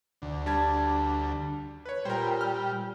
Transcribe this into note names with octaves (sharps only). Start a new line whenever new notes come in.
D2
G3 D4 A5 G#6
B4 C#5
A#2 G3 A#4 C5
F6